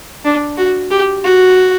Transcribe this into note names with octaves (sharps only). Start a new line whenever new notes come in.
D4
F#4
G4
F#4